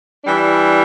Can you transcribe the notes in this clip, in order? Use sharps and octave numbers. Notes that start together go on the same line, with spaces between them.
E3 G3 D4